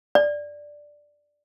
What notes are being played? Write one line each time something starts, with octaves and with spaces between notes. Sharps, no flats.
D5